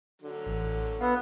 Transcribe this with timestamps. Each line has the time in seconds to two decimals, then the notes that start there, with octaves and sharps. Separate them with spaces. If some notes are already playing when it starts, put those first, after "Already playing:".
0.22 D3 F#3
0.46 A1
1.01 B3 F5 E6